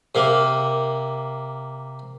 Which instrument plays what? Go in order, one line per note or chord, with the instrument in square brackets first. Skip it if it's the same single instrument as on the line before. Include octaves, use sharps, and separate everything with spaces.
[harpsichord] C3 A#3